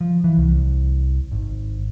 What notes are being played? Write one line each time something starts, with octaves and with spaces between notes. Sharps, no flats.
F3
E3
C2
G#1